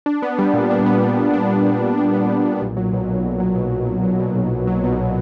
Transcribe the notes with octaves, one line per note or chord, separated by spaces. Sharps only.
D4
B3
G3
A#2
D4
B3
G3
A#2
D4
B3
G3
A#2
D4
B3
G3
A#2
B1
F#3
B2
B1
B1
F#3
B2
B1
B1
F#3
B2
B1
B1
F#3
B2